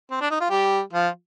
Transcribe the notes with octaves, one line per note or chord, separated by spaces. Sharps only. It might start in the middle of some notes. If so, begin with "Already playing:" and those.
C4
D4
D#4
F4
G3 G4
F3 F4